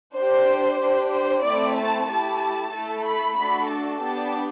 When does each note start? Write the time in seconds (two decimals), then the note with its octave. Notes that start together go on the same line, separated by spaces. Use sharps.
0.15 D4 G4 C5
0.80 D4 G4
1.12 C5
1.44 A3 C4 E4 D5
1.76 A5
2.08 A3 E4 G4 A5
2.73 A3 E4 A4
3.05 B5
3.38 A3 D4 F#4 A4 B5
3.70 A5
4.02 B3 D4 G4 A5